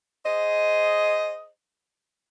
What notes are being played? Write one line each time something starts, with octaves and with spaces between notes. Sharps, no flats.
G#4 C5 D#5